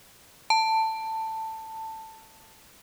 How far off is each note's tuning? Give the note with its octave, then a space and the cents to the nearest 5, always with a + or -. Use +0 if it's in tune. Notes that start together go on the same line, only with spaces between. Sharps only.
A5 +15